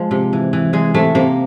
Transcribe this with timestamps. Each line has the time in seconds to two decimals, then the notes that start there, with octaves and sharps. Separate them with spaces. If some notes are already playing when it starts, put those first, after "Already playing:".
Already playing: F3 G#3
0.11 C3
0.33 E3
0.53 E3
0.73 E3 G#3
0.95 C3 A3
1.15 C3 A#3